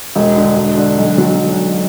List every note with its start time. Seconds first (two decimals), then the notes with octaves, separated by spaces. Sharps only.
0.16 E1
0.37 D3
0.57 E1
0.78 D3
0.98 B1
1.18 F#3